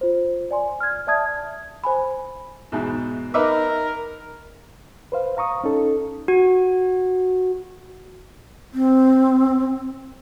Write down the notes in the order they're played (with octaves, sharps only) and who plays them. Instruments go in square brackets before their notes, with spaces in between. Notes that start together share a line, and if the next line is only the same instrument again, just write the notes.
[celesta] F4 C5
D5 G#5 C6
F6 G#6
D5 E5 A5 D#6 G#6
[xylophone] C5 G#5 B5
[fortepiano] E2 G#2 B2
[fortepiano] D#4 B4 E5 [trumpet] A#4 [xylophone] D6
[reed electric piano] B4 C5 F5
F5 A#5 C#6 D#6
C#4 D#4 A4
[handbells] F#4
[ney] C4